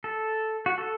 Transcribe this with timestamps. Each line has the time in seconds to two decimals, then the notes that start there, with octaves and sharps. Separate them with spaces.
0.04 A4
0.66 F#4
0.78 A4